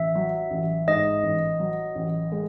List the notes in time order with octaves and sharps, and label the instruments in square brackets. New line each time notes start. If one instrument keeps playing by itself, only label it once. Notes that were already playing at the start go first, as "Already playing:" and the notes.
Already playing: [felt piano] A1 [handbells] E5
[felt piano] F#3
A1
[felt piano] G#2 [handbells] D#5
[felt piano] A1
F#3
A1
G#3